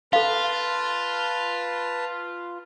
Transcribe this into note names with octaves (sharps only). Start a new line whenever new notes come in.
F4 A4 B4 F5 A5